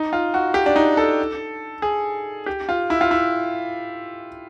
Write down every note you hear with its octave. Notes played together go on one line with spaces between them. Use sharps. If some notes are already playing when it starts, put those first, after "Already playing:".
Already playing: D#4
F4
F#4
G4
D4
D#4
A4
G#4
G4
F4
E4
F4
E4